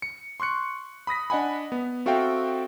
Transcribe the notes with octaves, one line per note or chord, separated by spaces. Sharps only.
C#7
C6 C#6 F#6 C#7
B5 D#6 A#6 B6
D4 D#5 F#5 G#5 B5
B3
C4 F#4 A4 E5 F5 G5